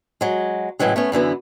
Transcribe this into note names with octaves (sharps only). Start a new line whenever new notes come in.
F#3 G#3
A2 C#3 E3 F#3 G#3
A3 B3 C#4
F#2 D3 E3 B3